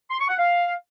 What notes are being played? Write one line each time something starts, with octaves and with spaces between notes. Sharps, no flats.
C6
C#6
F#5
F5